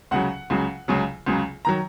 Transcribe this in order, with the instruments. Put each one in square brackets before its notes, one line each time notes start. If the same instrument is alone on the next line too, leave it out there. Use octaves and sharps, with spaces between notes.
[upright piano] C#2 C#3 F#3 F#5
C#2 C#3 F#3
C#2 C#3 F#3
C#2 C#3 F#3
D#3 F#3 A#5